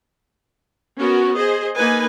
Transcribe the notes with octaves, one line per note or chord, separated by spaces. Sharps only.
B3 C#4 F#4 A#4
G#4 C5 D#5
A#3 D#4 B4 G#5